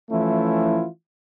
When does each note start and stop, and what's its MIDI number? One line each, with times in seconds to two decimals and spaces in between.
0.11 0.86 52
0.11 0.86 53
0.11 0.86 57
0.11 0.86 61
0.11 0.86 64
0.11 0.86 65